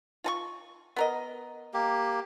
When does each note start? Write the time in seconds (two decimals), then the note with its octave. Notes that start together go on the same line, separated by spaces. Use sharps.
0.24 F4 A5 C#6
0.96 B3 A#4 D#5
1.74 A#3 G4